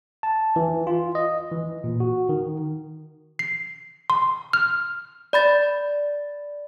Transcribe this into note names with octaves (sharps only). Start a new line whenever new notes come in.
A5
E3
F4
D#5
E3
A#2
F#4
D#3
C7
C6
F6
D5 B5 A6